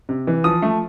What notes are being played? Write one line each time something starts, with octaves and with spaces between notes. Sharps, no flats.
C3
E3
F3 D#6
A3